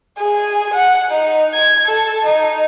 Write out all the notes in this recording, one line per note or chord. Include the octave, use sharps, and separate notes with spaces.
G#4
F#5
D#4
G#6
A4
D#4